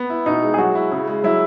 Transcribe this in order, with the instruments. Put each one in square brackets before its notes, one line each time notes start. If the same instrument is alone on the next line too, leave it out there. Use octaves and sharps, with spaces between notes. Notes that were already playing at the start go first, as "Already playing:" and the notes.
Already playing: [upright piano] B3
E4
[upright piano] B2 [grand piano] D#4
[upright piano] G#3
[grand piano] G#4
[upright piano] F#3 [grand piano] F#4
[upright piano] E4
C#3
G#3
[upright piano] F#3 [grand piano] E4